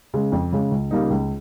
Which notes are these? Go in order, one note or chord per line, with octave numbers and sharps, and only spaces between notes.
C#3 G#3
F2
C#3 G#3
C#2
C#3 G3 A#3 D#4
C#2